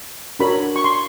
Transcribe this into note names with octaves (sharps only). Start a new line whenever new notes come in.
D4 F#4 A#4 C#5 B5
C#6
C6